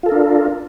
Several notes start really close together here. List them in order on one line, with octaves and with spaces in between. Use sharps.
F4 A4 A#4 D4